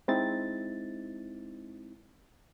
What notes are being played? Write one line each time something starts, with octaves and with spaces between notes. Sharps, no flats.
G#3 C4 D#4 E4 A6